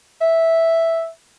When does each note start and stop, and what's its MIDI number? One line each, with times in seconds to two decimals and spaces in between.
0.21 1.07 76